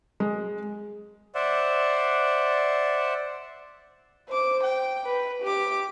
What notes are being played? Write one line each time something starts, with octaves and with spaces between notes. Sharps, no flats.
G#3
C5 D5 E5 F#5
C5 D6
G5
B4
G4 D6